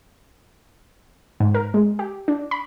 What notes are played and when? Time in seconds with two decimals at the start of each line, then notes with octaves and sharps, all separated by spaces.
1.40 G#2
1.54 A#4
1.74 G#3
1.99 G4
2.28 D4
2.51 B5